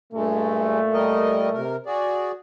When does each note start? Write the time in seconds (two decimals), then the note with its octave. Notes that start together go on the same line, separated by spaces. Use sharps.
0.13 G2 A#2 G#3 A3
0.93 G3 A#4 D#5
1.53 C3 A#4
1.86 F#4 G#4 D5